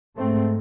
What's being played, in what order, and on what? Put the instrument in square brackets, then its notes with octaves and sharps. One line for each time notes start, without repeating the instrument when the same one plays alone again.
[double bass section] G#2 A3 C4